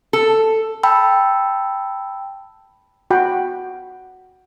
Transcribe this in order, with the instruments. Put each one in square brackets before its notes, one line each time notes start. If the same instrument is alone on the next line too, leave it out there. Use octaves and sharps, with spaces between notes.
[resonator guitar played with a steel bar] A4
[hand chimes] G5 A5 B5 E6
[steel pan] F#4 G5 B5